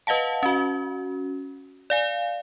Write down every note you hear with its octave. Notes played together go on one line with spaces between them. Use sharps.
B4 D#5 F5 F#5 A5
C#4 F#4
D5 F5 G#5